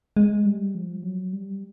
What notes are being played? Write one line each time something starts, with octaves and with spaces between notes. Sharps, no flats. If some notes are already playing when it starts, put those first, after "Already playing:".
G#3
G3
F3
F#3
G3